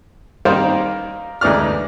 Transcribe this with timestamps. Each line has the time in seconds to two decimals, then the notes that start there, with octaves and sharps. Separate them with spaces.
0.45 D#3 G3 A#3 D#4 A#4 C5
1.41 D2 G#2 E3 D5 F6